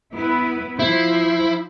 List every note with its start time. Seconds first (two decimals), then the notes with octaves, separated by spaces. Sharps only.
0.15 B3 E4 B4
0.79 F3 E4 C5